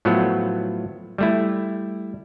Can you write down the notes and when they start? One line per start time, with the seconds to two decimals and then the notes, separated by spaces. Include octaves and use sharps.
0.05 A2 F3 F#3 A3 B3
1.18 G3 A3 E4